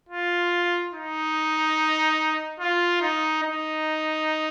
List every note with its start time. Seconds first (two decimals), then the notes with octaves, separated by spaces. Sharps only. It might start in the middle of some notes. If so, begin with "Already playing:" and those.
0.09 F4
0.93 D#4
2.60 F4
3.02 D#4
3.43 D#4